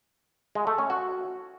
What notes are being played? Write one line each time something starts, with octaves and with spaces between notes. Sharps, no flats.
G#3
A3
C#4
F#4